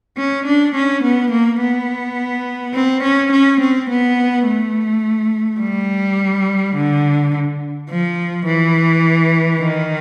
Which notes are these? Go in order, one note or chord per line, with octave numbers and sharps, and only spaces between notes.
C#4
D4
C#4
B3
A#3
B3
C4
C#4
C#4
C4
B3
A3
G3
D3
F3
E3
D#3